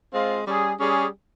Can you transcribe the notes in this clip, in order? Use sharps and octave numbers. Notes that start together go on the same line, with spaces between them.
G#3 C4 F4
G3 C#4 G#4
G3 C#4 G#4